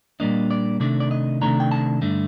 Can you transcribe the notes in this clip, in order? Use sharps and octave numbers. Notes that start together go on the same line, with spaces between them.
A#2 G3 A#3 D4 D#5
D5
C3 D#3 A3 D4 D5
D5
D#5
C3 D#3 A3 D4 A#5
G5
A5
G2 D3 A3